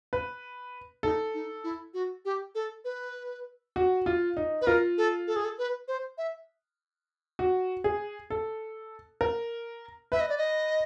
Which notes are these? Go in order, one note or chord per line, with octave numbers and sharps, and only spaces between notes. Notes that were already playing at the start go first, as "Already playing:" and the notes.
B4
D#4 A4
D#4
E4
F#4
G4
A4
B4
F#4
F4
D#4
B4
F4 A#4
A4
A4
G#4
A4
B4
C5
E5
F#4
G#4
A4
A#4
B4 E5
D#5
D5
D#5